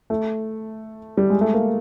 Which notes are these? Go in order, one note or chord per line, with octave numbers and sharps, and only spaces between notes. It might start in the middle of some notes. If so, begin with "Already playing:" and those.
A3
G3
G#3
A3
A#3